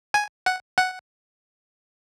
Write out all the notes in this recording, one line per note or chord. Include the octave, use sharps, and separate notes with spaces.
G#5
F#5
F#5